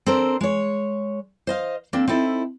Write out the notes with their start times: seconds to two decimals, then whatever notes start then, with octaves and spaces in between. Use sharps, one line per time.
0.06 C4 D4 A4 A#4 C5
0.41 G#3 C#5
1.47 C5 D#5 F5
1.93 A#3 C4 D4 A4
2.08 C4 D#4 E4 A4